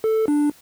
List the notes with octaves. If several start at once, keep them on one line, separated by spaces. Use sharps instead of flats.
A4
D4